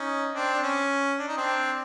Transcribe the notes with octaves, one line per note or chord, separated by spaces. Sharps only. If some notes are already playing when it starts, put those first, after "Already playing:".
Already playing: C#4 D#4
C4 D4
D4
C#4
D4
D#4
C4 D4